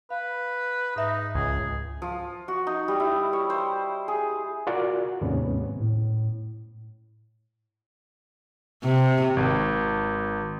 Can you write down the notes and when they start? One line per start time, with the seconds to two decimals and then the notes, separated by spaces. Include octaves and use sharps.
0.10 B4 F5
0.96 G#2 D#4 E5 A#6
1.35 C#2 G#4
2.02 F3
2.48 F#4
2.67 D#4
2.88 G3
3.00 E4
3.33 C#5
3.50 C5
4.08 G#4
4.67 F4 F#4 A#4 D5 F#5
5.21 D#2 G#2 C3 B3 C#4
5.80 A2
8.84 C3
9.37 G#1